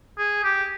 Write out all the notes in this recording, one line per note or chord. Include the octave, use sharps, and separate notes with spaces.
G#4
G4